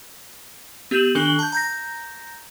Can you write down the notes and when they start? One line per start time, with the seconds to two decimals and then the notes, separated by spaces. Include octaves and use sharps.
0.91 B3 G4 G6 D#7 E7 F#7
1.15 D#3 D4 A4 F#6 F#7 G7
1.39 A5 G6
1.52 A#5 G6 A#6